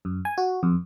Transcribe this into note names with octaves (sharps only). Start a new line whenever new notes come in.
F#2
G#5
F#4
F2